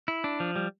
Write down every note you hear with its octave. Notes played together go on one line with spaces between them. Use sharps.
E4
D4
F3
G3